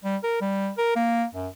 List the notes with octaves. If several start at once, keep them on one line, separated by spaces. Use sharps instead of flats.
G3
A#4
G3
A#4
A#3
F#2